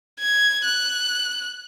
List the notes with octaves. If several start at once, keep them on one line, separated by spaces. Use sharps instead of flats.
G#6
F#6